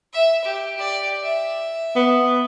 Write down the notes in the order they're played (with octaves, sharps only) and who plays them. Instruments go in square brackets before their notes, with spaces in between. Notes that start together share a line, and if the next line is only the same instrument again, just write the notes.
[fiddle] E5
G4
G4 D5
E5
[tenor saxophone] B3